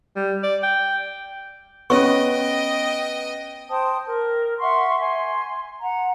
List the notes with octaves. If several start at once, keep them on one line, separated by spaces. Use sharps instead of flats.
G3
D5
G5
B3 C#4 C#5 D#5 G5 C#6
C5 G5 A5 D#6
A#4
E5 F#5 C6 C#6
G#5 C6
F#5 A#5